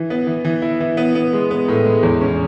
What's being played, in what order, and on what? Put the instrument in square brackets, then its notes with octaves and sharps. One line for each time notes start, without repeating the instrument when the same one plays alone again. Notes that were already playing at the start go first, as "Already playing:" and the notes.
Already playing: [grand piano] E3
B3
E3
E3
E4
E3
B3
B3
G#3
B3
A2
G#3
E2
C#4